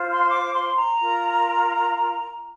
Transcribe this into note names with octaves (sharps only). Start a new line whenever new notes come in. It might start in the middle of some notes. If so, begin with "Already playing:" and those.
Already playing: F4 C5
C6
D6
C6
A#5
F4 A#4